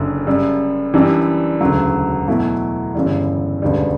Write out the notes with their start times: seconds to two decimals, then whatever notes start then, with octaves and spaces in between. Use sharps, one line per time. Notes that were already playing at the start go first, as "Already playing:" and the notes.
Already playing: F#1 F#2 D3
0.27 F#2 C#3 G3
0.94 F#2 E3 G3 D4 G4
1.61 E1 D2 C#3 F#3
2.28 E2 B2 F#3 A3 E4
2.95 G1 F#2 C#3 E3 G3
3.62 E1 D2 C#3 G3